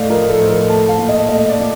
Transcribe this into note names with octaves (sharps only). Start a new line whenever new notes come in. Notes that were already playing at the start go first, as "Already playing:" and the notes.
Already playing: A2 A3 D5 D#5 F5
F3 A#4
A4
A2 C5
A#4
A3 A5
F5
A#2
D#5
A3 D#5
D5
A#2